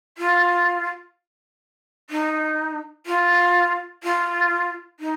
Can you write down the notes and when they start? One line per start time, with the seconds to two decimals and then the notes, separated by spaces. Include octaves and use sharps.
0.18 F4
2.10 D#4
3.06 F4
4.03 F4
5.00 D#4